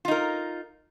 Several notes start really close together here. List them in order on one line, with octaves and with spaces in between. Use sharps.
F4 D#4 A#4